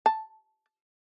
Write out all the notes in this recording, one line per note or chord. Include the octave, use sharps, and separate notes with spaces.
A5